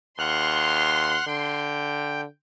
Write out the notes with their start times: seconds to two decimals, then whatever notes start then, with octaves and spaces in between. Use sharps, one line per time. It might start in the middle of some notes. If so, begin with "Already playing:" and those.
0.19 D#2 F#5 C6 F6 F#6
1.27 D3 G5